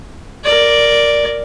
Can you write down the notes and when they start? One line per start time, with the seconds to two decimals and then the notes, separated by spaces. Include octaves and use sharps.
0.44 A#4 D5